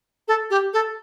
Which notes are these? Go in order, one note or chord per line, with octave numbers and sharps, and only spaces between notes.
A4
G4
A4